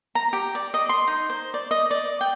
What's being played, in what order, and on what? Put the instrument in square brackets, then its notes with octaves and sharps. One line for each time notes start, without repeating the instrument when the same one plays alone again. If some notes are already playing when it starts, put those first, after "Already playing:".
[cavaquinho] A#5
G4
D5
D#5
C6
D#4
C5
D5
D#5
D5
G5